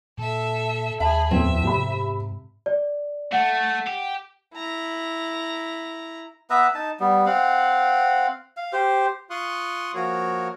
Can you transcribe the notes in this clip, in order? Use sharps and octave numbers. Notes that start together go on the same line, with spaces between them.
A#2 A4 E5
D#2 G#4 E5 A5 B5
F2 A2 B3 C4 E5
G#2 C3 B5
D5
A3 F#5
G4
E4 A#5
B3 B4 E5 A#5
D#4 A5
G3 B3
C4 F5 F#5
F5
G4 C5
F4 F5 C6 C#6 D#6 F#6
F3 A#3 F#4 A#4 C#5